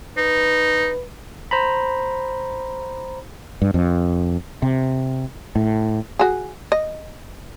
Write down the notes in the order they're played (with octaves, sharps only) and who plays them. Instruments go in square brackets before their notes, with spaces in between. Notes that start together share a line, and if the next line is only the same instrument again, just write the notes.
[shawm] D#4 [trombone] B4
[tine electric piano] C5 A#5 B5
[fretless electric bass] G2
F2
C3
A2
[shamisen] F#4 G#4
D#5